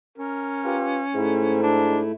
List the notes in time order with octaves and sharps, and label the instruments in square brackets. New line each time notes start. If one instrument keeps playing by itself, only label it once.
[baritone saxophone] C#4 [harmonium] A#4
[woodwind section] F4 G4 B4
[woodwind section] G#2 [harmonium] A3 E4
[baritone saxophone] D4